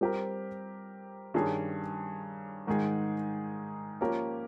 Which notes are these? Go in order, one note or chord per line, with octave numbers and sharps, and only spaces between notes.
G3 C4 G4 A#4
G2 D#3 G3 C#4 G#4
G#2 D#3 G#3 D#4 G#4
F3 A#3 C#4 G4 A#4